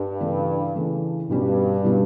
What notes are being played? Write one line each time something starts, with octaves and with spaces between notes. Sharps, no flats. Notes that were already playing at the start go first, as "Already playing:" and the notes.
Already playing: G2
C#3 E3 A3 D4
C#3 E3 A3 D4
G2 B2 G3 C#4 G4
B2 G3 C#4 G4